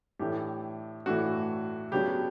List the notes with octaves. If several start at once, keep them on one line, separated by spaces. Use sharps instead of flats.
A2 E3 A3 D4 G4
A2 E3 A3 D4 F#4
C#3 F#3 B3 D4 G4